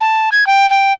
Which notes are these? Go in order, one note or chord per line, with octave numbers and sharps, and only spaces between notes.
A5
G#6
G5
G5